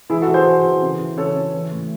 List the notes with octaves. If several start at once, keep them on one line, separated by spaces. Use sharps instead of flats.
E3 E4 G#4
F#4 A4
E3
G#4 C5
E3
E3
C#3
E3
C#3 A4 C#5
C#3
E3
A2